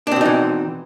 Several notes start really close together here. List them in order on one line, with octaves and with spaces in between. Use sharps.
D4 C4 B2 D#4 E3